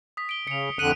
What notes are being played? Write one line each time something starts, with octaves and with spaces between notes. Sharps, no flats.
D#6 B6
D7 G7
C#3 C#7 F7
F2 D3 F#6 C#7 D#7